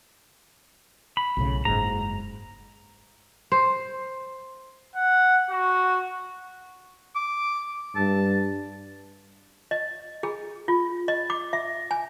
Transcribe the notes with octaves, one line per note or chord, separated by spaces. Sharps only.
B5
B1 A2 C#3
F#1 G#2 A#5
C5
F#5
F#4
D6
G2 A5
D#5
G#4
F4
D#5
D6
E5
G#5